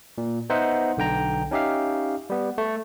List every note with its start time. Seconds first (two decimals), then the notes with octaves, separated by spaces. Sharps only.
0.18 A#2
0.50 B3 D#4 C5 E5 F#5
0.97 B1 D3 G5 A#5
1.51 C#4 D#4 G4 E5 F5
2.30 G3 B3
2.58 A3